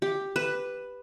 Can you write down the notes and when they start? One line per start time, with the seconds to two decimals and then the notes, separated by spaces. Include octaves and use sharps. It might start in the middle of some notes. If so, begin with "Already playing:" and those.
0.02 G4
0.36 B4